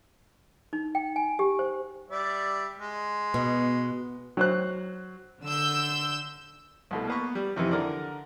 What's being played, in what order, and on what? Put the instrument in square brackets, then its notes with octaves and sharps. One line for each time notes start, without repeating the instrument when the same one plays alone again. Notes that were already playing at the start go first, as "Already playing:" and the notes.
[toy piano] D#4
G5
G#5
G4
C5
[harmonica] G3 D5 E5
G#3
[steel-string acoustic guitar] B2
[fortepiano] F#3 C5 F#6
[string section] D3 E6 G6
[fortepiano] C2 B2 A3
A#3 B3 C#6
G3
F2 C3 D#3 E3
D3 A#4 D5